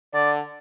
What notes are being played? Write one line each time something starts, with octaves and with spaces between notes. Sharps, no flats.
D3 D5